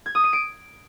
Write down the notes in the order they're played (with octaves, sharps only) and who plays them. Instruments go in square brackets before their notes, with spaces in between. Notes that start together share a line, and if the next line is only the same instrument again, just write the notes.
[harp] G#6
D#6
D#7
D7